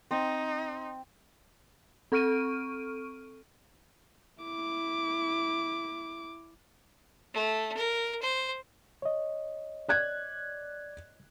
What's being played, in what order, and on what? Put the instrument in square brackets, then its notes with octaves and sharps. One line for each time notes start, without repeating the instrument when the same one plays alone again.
[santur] C4 [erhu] D#4
[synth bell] C4 A4 C#6 F6 D7 D#7
[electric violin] E4 D6
[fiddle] A3
A#4
C5
[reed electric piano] C#5 D#5
[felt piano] D5 F#6 G#6